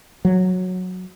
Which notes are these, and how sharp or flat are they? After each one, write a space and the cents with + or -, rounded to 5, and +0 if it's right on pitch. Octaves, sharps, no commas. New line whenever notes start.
F#3 -10